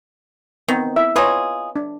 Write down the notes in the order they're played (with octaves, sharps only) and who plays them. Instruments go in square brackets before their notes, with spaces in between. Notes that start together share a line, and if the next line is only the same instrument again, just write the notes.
[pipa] D#3 [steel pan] B3 C4
[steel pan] E4 E5
[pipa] D#4 F4 G#4 [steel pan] B4 C#5
[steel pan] D4